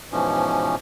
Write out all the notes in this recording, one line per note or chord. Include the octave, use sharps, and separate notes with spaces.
G#2 B2 E3 F3 C#4